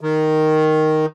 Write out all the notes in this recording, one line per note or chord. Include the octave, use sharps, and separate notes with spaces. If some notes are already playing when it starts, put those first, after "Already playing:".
D#3